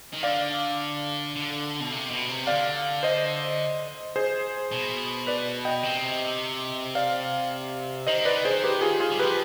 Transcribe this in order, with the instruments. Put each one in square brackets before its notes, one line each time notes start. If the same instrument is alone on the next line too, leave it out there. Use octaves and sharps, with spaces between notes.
[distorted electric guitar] D#3
[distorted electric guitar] D3 [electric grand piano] D5 F5
[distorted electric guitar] D3
B2
C3
B2
C3
[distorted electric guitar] D3 [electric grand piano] D5 F5
[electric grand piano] C5 D#5
G#4 C5
[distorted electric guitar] B2
[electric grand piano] B4 D5
D#5 G5
[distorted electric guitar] C3
[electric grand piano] D5 F5
[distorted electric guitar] D#3 [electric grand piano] C5 D#5
[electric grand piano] B4 D5
G#4 C5
G4 B4
F4 G#4
F4 G#4
[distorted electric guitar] G3
[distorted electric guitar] F3 [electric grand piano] G4 B4